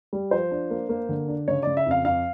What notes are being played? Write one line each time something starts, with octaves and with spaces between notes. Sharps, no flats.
G3
F3 C5
D4
A#3
A#3
D3
D4
C#3 C#5
C#3 D5
E5
F2 F5
F2 F5